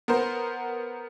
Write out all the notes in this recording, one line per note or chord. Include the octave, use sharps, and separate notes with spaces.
B3 A#4 C5